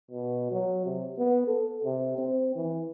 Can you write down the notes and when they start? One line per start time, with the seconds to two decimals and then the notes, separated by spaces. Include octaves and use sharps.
0.11 B2
0.51 F#3
0.86 C3
1.18 B3
1.47 A4
1.84 C3
2.18 C4
2.55 E3